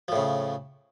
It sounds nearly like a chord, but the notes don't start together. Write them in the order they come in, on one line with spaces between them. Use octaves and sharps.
F3 A2 C#3